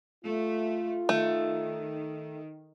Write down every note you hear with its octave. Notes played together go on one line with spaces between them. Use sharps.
A3 F4
D#3 A3